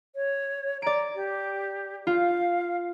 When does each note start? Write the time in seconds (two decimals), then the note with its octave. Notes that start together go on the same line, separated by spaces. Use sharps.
0.16 C#5
0.82 D5 A#5 D7
1.15 G4
2.07 F4 F5